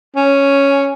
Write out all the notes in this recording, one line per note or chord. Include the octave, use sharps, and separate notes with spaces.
C#4